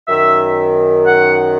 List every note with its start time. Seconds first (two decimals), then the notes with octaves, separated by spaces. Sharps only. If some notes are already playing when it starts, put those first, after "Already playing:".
0.07 F#2 D#3 E5
1.05 F#5